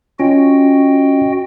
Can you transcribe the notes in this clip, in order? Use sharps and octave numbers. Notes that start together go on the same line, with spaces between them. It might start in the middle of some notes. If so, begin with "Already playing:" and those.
C#4 F4 F#4 D#5 G5